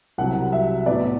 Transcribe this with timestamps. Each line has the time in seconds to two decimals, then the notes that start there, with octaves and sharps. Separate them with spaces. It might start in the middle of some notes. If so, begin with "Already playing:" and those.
0.18 C2 C3 F#3 F#5
0.53 E5
0.86 A2 F#3 B3 D5